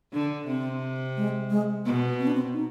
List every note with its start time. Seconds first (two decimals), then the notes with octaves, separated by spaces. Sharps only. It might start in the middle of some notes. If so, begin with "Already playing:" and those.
0.13 D3 D4
0.47 C3 C4
1.17 G#3
1.50 G#3
1.85 B2 B3
2.20 C4
2.27 D4
2.34 C4
2.54 D#4